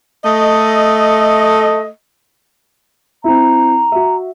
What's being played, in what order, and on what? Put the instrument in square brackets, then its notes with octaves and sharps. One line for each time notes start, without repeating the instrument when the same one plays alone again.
[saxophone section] A3 D#5
[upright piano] C4 E4 [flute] A#5
[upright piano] F#4 E5